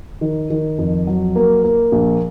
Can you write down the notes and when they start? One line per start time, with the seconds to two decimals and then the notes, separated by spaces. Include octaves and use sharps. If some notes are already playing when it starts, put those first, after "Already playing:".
0.21 D#3
0.50 D#3
0.78 F2
1.07 F#3
1.36 A#3
1.63 A#3
1.92 A#1